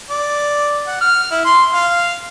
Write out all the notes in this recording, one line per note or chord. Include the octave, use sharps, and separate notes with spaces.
D5
F#5
F6
E4
C6
F5